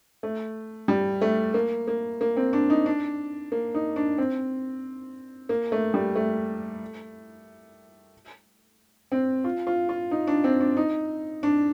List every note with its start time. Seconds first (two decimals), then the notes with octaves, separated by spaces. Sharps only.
0.23 A3
0.88 G3
1.21 A3
1.54 A#3
1.88 A#3
2.21 A#3
2.37 C4
2.53 D4
2.70 D#4
2.86 D4
3.52 A#3
3.74 D#4
3.96 D4
4.18 C4
5.49 A#3
5.72 A3
5.94 G3
6.16 A3
9.12 C4
9.44 F4
9.67 F4
9.89 F4
10.11 D#4
10.27 D4
10.44 C4
10.60 D4
10.77 D#4
11.43 D4